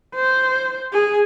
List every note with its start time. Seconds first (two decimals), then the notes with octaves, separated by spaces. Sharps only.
0.15 C5
0.93 G#4